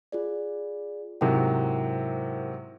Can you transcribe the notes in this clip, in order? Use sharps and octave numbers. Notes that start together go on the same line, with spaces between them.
F4 G#4 D5
G#2 C3 F#3 E4 A#4 G5